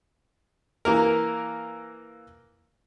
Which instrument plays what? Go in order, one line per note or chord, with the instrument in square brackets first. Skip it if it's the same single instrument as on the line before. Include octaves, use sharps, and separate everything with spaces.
[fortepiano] E3 A#3 A#4